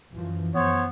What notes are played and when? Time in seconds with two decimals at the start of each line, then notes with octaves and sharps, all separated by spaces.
0.13 F#2 E3 F3
0.55 F#2 B3 C5 C#5